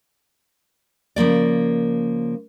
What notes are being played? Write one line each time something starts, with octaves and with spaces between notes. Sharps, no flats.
C#3 F3 A#3 D5